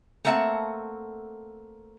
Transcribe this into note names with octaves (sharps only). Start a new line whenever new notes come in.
A3 A#3 C4 E5 F#5 A5